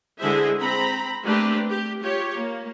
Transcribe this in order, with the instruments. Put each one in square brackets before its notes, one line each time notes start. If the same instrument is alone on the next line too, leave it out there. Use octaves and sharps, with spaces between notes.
[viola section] D3 G#3 E4 G#4 C5 E5
C4 A#5 B5
A3 A#3 C4 D4 G4 B4
G4
F4 G4 C#5
A#3